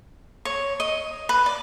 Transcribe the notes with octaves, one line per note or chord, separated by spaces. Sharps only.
C#5
D#5
B4
D5